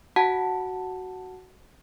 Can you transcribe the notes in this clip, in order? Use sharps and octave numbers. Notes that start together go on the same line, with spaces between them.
F#4 F#5 A5